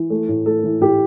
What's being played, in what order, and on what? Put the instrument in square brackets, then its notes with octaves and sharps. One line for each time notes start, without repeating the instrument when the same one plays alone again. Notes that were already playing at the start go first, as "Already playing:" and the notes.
Already playing: [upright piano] E3
A3
A2
A3 A4
E3
A2 G4